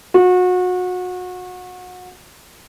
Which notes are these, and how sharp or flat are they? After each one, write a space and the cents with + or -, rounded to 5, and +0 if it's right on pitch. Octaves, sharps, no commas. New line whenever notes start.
F#4 -30